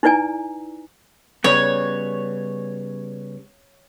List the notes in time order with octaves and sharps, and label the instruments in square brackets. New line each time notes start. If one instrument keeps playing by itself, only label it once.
[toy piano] D#4 E4 B4 D5 G#5 A#5
[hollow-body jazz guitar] C#3 G3 B3 [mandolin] C#5